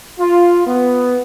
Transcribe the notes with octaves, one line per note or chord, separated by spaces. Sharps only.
F4
B3